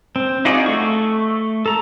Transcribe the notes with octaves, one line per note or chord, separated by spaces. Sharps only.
C4
D#4 F4 F#4 G#4 D5
A3 C#6
A4 A#5